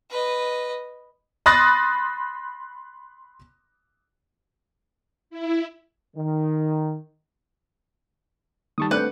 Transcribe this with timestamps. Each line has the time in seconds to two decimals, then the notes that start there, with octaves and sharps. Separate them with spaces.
0.10 B4 D#5
1.46 B5 C6 D#6 F#6 A6 A#6
5.30 E4
6.17 D#3
8.78 D#3 G3 A5 C#6 D#6
8.91 A3 C4 D4 B4 D5 F#5 F#6 G6